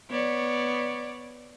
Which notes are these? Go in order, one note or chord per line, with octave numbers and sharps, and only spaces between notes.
B3 C#5 D5